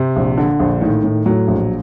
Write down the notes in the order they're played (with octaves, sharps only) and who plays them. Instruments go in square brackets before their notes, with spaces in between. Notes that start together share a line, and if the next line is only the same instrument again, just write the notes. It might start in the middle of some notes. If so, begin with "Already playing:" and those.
Already playing: [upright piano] C3
[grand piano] A#1
[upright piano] D3 [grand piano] D4
[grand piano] A#1
[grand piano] A2 [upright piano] D#3
[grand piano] A2
[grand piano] A2 [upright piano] F#3
[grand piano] A#1